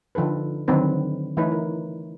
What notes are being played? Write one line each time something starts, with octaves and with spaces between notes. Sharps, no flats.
D3 F3 D#4 A4 B4
D3 D#3 F#3 C4 D#4 B4
E3 A3 D#4 E4 B4 C#5
A#4